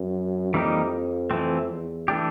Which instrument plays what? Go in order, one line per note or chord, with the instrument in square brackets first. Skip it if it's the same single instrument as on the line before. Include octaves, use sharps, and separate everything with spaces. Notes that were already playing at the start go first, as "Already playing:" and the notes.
Already playing: [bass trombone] F#2
[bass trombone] F2 [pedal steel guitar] E3 G3 A#3 D#4 G4
[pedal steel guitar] E3 A3 C4
[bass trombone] E2
[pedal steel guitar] E3 A3 D4 G4